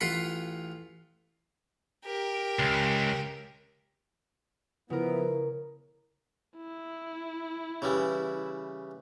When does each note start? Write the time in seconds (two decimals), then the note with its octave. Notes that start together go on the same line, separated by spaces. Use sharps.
0.01 A1 F4 F5 F#5 B5
2.05 G4 A#4
2.59 C#2
4.90 C#3 F3 B3 E4 A#4
6.57 E4
7.82 C#3 E3 G3